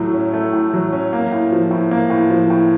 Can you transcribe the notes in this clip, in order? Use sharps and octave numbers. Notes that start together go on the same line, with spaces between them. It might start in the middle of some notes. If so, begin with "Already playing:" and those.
Already playing: A2 F#3 A3
C#4
A3
A2
F#3
C#4
A#3
A2
F3
A2
A#3
A2
F3
A2